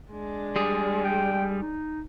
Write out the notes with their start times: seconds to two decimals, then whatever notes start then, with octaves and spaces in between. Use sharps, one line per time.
0.12 G#3 D4
0.56 G3 G#4
1.04 G5
1.60 D#4